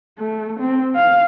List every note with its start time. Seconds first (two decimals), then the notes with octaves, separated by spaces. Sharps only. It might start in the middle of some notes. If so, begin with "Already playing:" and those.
0.19 A3
0.59 C4
0.96 F5